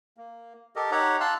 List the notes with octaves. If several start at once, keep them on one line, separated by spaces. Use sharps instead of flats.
A#3
G4 A4 A#4 D#5
D#4 G4 C#5 F#5 A#5
F5 A5 C6 E6 F#6